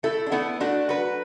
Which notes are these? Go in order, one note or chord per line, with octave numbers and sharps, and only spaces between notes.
A3 E4 A4
D4
A3 B3 E4
A3 D4 F#4
F#3 F#4 B4